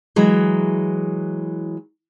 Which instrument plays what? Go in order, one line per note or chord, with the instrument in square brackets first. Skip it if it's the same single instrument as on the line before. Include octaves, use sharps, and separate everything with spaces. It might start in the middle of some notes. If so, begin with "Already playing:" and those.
[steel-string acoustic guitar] E3 F#3 G#3